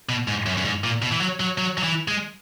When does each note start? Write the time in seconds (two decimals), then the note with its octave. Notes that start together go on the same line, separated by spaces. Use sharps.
0.09 B2
0.28 G#2
0.46 F#2
0.57 F#2
0.65 G#2
0.84 A#2
1.02 B2
1.12 E3
1.21 F#3
1.40 F#3
1.58 F#3
1.78 F#3
1.83 E3
2.08 G#3